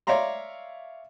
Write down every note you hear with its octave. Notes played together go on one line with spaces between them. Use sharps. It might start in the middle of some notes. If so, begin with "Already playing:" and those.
C#5 D5 E5 F5 A#5 C6